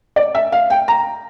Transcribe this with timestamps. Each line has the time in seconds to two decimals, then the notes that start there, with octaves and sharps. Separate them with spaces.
0.16 D5
0.35 E5
0.52 F5
0.70 G5
0.88 A#5